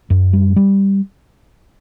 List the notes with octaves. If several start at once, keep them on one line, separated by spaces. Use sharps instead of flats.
F#2
G3
G3